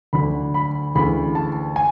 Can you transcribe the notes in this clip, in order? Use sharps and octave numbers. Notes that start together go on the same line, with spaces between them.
D2 D3 F#3 B5
B5
D2 C#3 E3 B5
A5
G#5